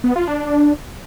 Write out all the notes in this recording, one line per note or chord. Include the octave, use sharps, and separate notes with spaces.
B3
F4
D4